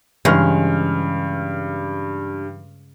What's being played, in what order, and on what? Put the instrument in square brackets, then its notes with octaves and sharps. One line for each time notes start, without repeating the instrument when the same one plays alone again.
[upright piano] G2 F6 [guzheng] C#3 G#3 [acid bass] E3